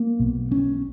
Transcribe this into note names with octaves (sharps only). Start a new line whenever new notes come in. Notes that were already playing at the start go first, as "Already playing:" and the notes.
Already playing: A#3
B1 B2
C#4